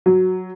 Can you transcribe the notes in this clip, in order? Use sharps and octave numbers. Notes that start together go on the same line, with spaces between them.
F#3